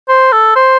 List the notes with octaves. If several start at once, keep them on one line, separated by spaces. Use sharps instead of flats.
C5
A4
C5